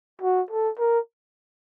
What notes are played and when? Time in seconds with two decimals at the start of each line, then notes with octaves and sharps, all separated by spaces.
0.22 F#4
0.51 A4
0.79 A#4